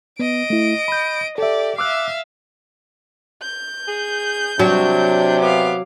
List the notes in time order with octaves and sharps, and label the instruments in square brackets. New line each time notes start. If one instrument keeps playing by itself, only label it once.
[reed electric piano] B3 [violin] D#5 D7
[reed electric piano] A3 E4
B5 G6
[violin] G4 D5 [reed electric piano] A4 E5
[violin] E5 F5 [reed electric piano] D6 E6 F#6
[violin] G6
[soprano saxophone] G#4
[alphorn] C3 [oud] F#3 [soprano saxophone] D4
[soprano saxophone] B3 [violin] F5 D6